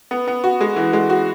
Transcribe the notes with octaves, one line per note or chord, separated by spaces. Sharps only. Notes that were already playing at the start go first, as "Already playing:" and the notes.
B3
B3
F#4
G#3
E3
G#3
F#4